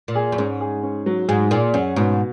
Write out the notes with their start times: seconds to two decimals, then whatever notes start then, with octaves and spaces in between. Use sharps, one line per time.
0.08 A#2
0.15 G#4
0.32 F#2
0.38 G#2 C#4
0.61 G#4
0.83 C#4
1.06 F#3
1.28 G#2 G#4
1.51 A#2 G#4
1.74 F#2 C#4
1.96 G#2 B2